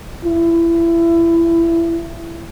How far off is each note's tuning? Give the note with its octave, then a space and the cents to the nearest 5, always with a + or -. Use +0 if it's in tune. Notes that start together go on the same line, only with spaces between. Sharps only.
E4 +25